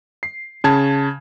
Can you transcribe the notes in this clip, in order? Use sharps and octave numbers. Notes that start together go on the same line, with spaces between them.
C7
C#3 A5 G#6